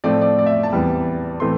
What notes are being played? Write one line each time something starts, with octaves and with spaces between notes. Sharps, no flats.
A2 F3 A3 C4 D5
D5
D5
E5
A5
E2 E3 G3 C4
A2 E3 A3 C4 C6